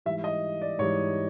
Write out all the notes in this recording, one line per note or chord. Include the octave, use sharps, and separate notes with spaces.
G#2 E3 G3 E5
D#5
D5
G#2 E3 G3 C#5